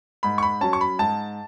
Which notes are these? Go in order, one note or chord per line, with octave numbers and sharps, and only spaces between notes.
G#2 B5
C#6
B5
F#3 C#4 A5
C#6
B5
G#2 A5